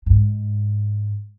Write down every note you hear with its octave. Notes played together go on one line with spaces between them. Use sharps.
G#2